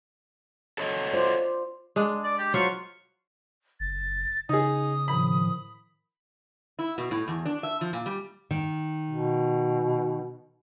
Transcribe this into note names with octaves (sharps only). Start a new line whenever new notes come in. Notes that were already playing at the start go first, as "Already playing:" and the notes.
A4 C#5 D#5
F4 C5 D5
G#3 D4
D5
G4
F#3 F4 C5 C#6
F#1 A6
C#3 D#4 G#4 D#6
A2 D#3 F3 B5
E4
B2
A2
E2
D4
E5
F3
A#2
G3
D#3
B2